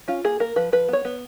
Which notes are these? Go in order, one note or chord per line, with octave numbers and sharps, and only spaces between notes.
C#4 F4
A#3 G#4
A#3 A#4
F3 B4
F3 B4
B3 C#5
B3